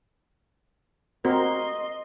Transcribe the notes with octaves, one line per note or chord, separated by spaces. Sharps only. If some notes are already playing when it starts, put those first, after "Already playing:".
C4 F#4 A#4 D#5 C6